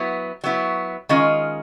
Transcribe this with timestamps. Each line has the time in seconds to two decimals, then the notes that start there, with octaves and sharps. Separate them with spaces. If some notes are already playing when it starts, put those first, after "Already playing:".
Already playing: F#3 B3 E4
0.44 F#3 B3 E4
1.09 D#3 G#3 C#4 F4